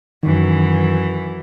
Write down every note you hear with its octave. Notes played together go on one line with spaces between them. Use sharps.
F#2 D#3 E3